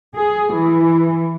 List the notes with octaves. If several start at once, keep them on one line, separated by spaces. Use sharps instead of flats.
G#4
E3